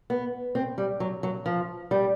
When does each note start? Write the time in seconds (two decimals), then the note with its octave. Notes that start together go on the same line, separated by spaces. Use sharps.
0.10 B3
0.55 C4
0.78 G3
1.00 F#3
1.23 F#3
1.46 F3
1.91 G3